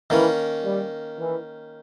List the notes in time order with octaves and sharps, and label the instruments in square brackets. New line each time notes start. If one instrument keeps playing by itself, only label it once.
[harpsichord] D#3 A#3 C#4 [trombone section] E3
[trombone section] G3
E3